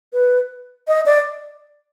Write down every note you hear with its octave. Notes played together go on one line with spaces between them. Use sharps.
B4
D#5
D5